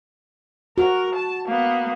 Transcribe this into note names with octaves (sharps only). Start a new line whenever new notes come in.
F#4 A#4
A5
A#3 B3